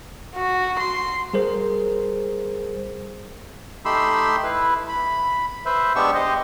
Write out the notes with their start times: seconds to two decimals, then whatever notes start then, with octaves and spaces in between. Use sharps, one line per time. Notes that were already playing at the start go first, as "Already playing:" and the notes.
0.35 F#4
0.78 C6
1.34 G3 G#4 A#4 C5
3.85 A3 D#4 G4 B5 C6 E6
4.44 E4 B4
4.89 B5
5.66 B4 C5 E5
5.96 G#3 B3 D4 G4 C#6 E6
6.15 G4 C5 D#5